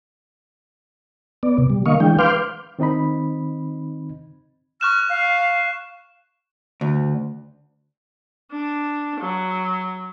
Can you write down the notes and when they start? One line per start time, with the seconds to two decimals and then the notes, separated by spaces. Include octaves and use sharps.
1.43 B3 D5
1.58 C3
1.70 G3
1.86 D3 A#3 D#5 F5 C#6
2.00 E3 G#3 D4 G5
2.19 B4 F5 C6 D6 F6 G6
2.79 D#3 C4 D#4 D#5 B5
4.81 C#6 F6 F#6 E7
5.09 F5
6.81 D2
8.52 D4
9.21 F#3